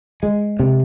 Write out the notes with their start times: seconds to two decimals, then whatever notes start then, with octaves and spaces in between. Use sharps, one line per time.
0.23 G#3
0.59 C3